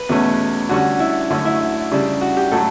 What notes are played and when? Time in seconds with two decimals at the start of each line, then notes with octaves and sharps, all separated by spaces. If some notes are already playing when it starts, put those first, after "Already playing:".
Already playing: B4
0.09 E2 B2 A3 C#4
0.69 D3 G3 C#4 F#4
1.00 E4
1.30 F#2 D3 A3 C#4 F#4
1.45 E4
1.92 C#3 G3 D4
2.21 F#4
2.37 G4
2.52 A2 F#3 A3 A4